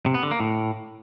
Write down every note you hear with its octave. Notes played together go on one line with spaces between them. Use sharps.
C3
B3
D3
A#3
A2